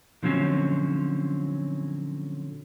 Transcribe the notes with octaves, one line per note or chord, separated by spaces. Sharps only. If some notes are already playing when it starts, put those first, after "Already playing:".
A#2 D3 F3 F#3 C4 C#4